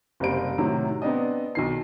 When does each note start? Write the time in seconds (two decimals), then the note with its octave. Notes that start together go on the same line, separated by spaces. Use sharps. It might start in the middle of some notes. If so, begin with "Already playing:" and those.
0.20 F#1 C3 G3 C5 D7
0.58 A2 C3 D#3 F#3
1.02 B3 C4 D4 D#5
1.55 B1 D#3 C7